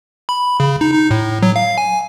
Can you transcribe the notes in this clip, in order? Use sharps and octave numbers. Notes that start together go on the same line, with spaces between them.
B5
C#3
D#4
D#4
A2
F#3
F5
G#5